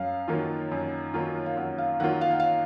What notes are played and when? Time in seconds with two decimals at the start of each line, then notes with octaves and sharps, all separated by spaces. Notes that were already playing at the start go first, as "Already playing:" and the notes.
Already playing: F#2 F5
0.28 D#3 F#3 A#3 F4
0.71 F#2
1.14 D#3 F#3 A#3 F4
1.46 F5
1.57 F#2 F#5
1.78 F5
1.99 D#3 F#3 A#3 F4 F#5
2.21 F5
2.31 F#5
2.40 F5